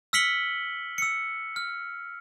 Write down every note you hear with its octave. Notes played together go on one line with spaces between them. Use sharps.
E6 F6 B6 C#7 F#7 G7
E6 C#7
F6